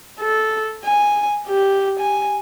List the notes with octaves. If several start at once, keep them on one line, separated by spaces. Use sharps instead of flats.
A4
G#5
G4
G#5